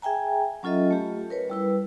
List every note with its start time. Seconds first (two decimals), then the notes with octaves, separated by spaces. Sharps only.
0.02 G#4 E5 G5 G#5 A#5
0.63 F#3 C#4 F4 A4 D#5 E5
0.91 A3 G4
1.30 A#4 B4 C#5
1.50 G3 E4 B4